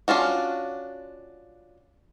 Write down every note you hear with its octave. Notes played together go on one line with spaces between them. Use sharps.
C#4 D4 F4 F#4